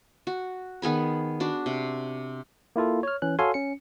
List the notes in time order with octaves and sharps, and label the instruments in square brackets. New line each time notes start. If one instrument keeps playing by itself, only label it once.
[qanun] F#4
D#3 B3 G#4 B5
D4 F#4
C3
[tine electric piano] A#3 E4 F4 A4
C#5 F6
E3 C#4 F#6
F#4 A4 C#5 F5 G#5 C6
C#4 C#7